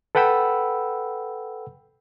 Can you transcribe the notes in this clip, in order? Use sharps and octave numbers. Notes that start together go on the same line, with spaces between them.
A4 B4 F#5 G5 B5 E6